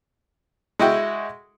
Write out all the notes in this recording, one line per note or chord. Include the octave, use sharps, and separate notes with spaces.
G#3 E4 F#4 G5